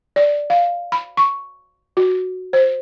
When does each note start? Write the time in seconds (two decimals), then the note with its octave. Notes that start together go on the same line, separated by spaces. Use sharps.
0.16 D5
0.50 F5
0.92 B5
1.17 C#6
1.97 F#4
2.53 C5